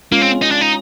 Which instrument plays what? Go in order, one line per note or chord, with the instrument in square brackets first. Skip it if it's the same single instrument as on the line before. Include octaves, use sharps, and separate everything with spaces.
[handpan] G#3 C#4 F4 [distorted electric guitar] A#3
[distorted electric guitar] C4
D#4
D4
D#4